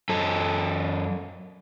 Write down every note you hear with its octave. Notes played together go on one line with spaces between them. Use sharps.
F#2 A4